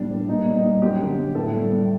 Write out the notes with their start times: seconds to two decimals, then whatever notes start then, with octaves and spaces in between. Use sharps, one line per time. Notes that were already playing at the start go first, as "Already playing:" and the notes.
Already playing: A2 G3 D4
0.11 G3
0.29 A#2 D#4
0.46 G3
0.56 D#4
0.65 G3
0.82 F#2 G4
1.00 D3
1.18 F#2
1.35 A2 A4
1.53 G3
1.71 G3